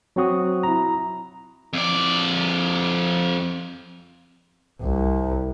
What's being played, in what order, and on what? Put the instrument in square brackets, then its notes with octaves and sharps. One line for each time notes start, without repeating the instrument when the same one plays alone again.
[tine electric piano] F#3 C4 F#4 D#6
E4 A#5
[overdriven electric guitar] F2 D5
[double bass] C2